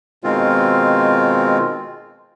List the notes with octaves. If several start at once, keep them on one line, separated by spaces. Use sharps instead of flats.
B2 D#3 G#3 C4 F4